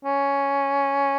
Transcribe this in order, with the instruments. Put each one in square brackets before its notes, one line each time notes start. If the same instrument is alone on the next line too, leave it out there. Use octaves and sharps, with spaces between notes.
[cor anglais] C#4